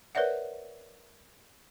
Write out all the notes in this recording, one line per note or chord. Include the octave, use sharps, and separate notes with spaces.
A#4 B4 C#5 D5 E5 F#5